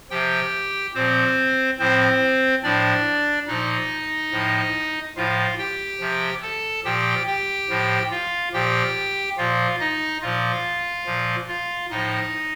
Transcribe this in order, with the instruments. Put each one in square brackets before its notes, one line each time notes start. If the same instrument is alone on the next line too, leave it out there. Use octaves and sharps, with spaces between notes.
[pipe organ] C3 F3 G4 G5
A#2 F3 C4 C5
A2 F3 C4 C5
A2 F3 D4 D5
A#2 F3 D#4 D#5
A2 F3
A2 F3 F4 F5
G4 G5
C3 F3
A4 A5
A#2 F3 G4 G5
G4 G5
A2 F3
F4 F5
A#2 F3 G4 G5
A#2 F3 F4 F5
D#4 D#5
A#2 F3 F4 F5
A#2 F3
F4 F5
A2 F3 D#4 D#5